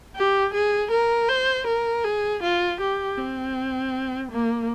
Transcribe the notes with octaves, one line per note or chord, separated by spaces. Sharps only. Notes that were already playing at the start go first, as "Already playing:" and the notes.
G4
G#4
A#4
C5
A#4
G#4
F4
G4
C4
A#3